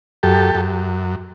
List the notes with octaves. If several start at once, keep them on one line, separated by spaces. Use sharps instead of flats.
F#2 G4 A4
F#2